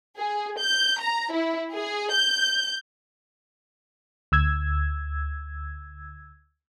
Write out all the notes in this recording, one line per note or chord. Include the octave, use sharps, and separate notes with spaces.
G#4
G6
A#5
E4
G#4
G6
D2 E6 G#6